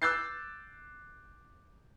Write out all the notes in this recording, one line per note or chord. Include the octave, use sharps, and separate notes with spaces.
D6 E6 F#6 G6 A6 C7